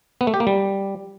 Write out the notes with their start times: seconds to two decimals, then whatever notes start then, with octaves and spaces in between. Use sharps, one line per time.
0.21 B3
0.27 A3
0.34 G4
0.40 A#3
0.47 G3